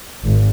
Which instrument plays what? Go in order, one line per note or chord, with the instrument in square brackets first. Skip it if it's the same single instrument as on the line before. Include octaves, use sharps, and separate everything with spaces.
[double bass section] G#1